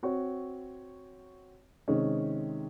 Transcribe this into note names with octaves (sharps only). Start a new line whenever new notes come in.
C4 F#4 C#5
C3 D#3 G#3 C#4